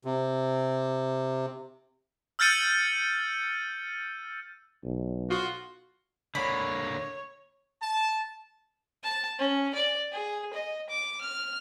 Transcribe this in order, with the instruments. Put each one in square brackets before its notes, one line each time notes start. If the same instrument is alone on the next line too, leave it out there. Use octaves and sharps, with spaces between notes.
[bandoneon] C3
[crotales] E6 F6 G6 A6 C#7 D#7
[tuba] B1
[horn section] F4 F#4
[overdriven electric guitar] D3 A#3 [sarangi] C#5 [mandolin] B5
[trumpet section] A5
[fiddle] A5
C#4
D5
G#4
D#5
D6
F6